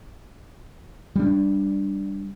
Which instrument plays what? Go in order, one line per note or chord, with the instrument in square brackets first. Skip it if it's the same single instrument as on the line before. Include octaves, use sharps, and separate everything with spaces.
[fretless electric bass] G3 C#4 D4